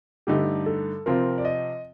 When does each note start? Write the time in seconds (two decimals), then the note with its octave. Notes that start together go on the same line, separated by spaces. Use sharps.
0.27 G2 D3 A3 D#4 G4
0.66 A4
1.06 C3 F3 C4 F4 A#4
1.38 D5
1.45 D#5